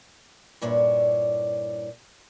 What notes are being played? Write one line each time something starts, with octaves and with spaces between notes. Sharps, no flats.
G2 A#2 D4 E4 C#5